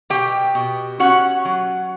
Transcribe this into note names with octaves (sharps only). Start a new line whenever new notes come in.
B2 G4 G5
B2
C#4 F#4 F#5
F#3